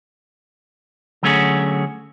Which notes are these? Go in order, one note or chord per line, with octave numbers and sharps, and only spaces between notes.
D3 F#3 A3 C#4 F#4 G#4